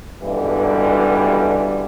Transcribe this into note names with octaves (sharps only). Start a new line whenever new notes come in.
C#2 G2 B2 D3 E3 G3